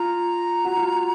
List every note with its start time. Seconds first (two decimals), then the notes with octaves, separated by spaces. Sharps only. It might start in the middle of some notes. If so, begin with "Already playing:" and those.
Already playing: F4 A#5
0.65 F#4
0.77 F4